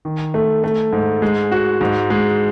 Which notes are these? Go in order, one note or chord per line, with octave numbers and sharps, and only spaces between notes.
D#3
A3
A3
G#2
G#3
F#4
G#2
G#3